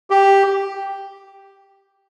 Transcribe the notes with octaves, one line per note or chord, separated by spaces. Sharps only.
G4